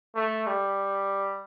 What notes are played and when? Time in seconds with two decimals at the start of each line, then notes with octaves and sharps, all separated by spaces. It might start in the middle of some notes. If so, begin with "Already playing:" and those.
0.16 A3
0.47 G3